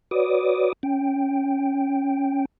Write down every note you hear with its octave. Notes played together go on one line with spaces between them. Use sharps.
F#4 B4 C#5 D5 D6 D#6
C#4 G5